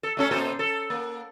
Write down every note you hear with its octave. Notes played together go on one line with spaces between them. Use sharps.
A4
A3 C#4 A4
A#2 A4 C5
A4
A#3